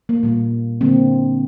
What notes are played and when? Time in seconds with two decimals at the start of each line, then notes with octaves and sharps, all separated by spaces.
0.09 A#3
0.23 A#2 G3 A#3
0.81 D3 G3 A#3 C4